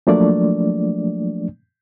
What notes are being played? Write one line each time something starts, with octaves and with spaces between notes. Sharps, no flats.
F3 F#3 A3 A#3 D4 D5